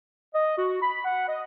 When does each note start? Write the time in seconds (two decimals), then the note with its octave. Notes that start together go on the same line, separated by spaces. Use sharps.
0.34 D#5
0.57 F#4
0.82 B5
1.04 F#5
1.27 D#5